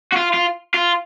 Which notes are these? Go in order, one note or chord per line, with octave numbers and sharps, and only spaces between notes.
F#4
F4
F4
F4